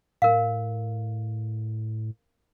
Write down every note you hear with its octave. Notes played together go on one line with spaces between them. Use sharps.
A2 A#4 F5